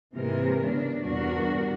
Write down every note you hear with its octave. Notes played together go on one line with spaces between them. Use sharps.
G#2 C3 E3 G#3 A#3 A#4
C#3 B3 D4
E2 G2 B2 D4 F#4 A#4